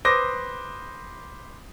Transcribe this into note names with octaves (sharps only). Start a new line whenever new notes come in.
B4 C5 D6 D#6 A#6